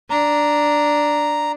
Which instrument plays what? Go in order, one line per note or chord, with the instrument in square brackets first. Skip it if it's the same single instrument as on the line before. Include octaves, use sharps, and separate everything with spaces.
[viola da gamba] D4 [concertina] A#5